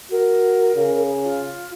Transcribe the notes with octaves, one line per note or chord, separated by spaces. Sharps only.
F#4 A#4
C#3
F4